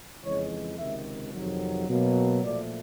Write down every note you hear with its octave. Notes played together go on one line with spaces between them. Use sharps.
F2 C#3 E3 G#3 C#5
C#2 C3 D#3 E5
F2 C3 D#3 F#3
B2 F#3 A#3
A#2 F3 A3 D5